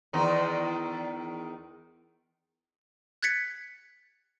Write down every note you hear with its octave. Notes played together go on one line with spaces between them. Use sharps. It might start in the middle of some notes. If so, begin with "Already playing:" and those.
E2 D#3 D#4
F#6 G#6 A6 B6 C#7